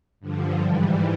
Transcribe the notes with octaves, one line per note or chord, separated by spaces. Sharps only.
G2 D3 F3
G#2 E3 G3